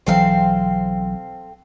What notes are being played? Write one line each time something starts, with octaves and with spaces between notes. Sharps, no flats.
B1 E3 F#3 C4 A4 F5